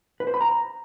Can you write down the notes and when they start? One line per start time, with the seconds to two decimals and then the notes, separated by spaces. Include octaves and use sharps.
0.20 B4
0.27 C5
0.34 B5
0.41 A#5